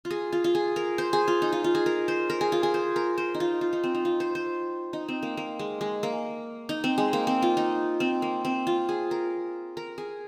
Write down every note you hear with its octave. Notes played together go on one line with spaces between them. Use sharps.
F4
G#4
F4
F4
G#4
A#4
C5
G#4
F4
D#4
F4
F4
G#4
A#4
C5
A#4
G#4
F4
G#4
C5
A#4
C5
D#4
F4
F4
D#4
C4
D#4
F4
C5
C5
D#4
C4
A#3
A#3
G#3
G#3
A#3
D#4
C4
G#3
A#3
C4
F4
D#4
C4
A#3
C4
F4
G#4
A#4
A#4
G#4